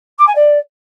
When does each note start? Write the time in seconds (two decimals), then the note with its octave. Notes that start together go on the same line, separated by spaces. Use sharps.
0.18 D6
0.27 G#5
0.35 D5